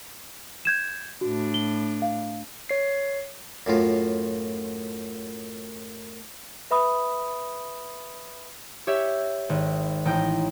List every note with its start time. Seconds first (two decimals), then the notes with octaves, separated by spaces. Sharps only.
0.65 G6 G#6 E7
1.21 A2 D4 F#4
1.54 G7
2.02 F5
2.69 C#5 C7
3.66 F#2 A2 F4
6.71 B4 E5 B5 D#6
8.87 G4 C#5 E5
9.49 G#1
10.05 A1 D#4 G5 A#6